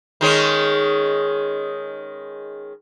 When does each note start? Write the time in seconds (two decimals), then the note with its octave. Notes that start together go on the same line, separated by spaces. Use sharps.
0.21 D#3 G#3 C#4